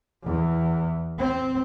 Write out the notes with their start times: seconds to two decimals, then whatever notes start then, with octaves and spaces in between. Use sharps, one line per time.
0.24 E2
1.18 C4